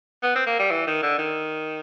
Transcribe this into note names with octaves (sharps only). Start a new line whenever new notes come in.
B3
C4
A#3
G3
E3
D#3
D3
D#3